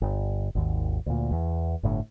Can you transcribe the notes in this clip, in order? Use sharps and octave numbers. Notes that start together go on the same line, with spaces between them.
G1
G#1 D#2
D2 A#2
E2
G1 A2 D3